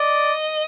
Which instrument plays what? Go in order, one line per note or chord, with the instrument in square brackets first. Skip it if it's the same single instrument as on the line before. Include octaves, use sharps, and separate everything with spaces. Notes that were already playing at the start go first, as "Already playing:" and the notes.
Already playing: [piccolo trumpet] D5 [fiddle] D#5